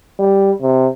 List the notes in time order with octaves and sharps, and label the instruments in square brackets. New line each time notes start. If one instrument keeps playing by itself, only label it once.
[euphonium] G3
C3